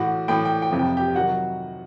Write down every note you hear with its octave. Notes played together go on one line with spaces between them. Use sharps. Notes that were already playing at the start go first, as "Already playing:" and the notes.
Already playing: A2 E3 F#4 F#5
A2 E3 G5
G5
G5
F2 C3 F3
G5
G4 G5
C3 D#3 F#3 F#4 F#5